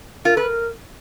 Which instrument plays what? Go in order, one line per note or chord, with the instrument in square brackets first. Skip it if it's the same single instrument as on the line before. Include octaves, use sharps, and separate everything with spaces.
[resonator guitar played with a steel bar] F4 [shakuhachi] A#4
[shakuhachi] A4 [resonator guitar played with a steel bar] B4
[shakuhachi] A#4